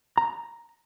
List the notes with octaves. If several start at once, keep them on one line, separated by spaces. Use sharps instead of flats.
A#5